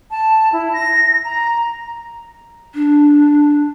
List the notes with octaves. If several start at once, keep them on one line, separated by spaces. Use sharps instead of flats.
A5
E4
A#6
A#5
D4